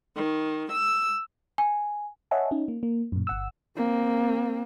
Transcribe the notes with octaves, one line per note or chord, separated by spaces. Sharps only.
D#3
E6
G#5
C#5 D#5 E5 F#5 G#5 A5
C#4 D#4
A#3
A#3
F#2 A#2
G1 F#5 E6
A#3 C4